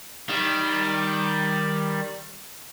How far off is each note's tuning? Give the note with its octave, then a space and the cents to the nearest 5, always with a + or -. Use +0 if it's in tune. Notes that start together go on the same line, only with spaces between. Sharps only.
D#3 +0 G3 +0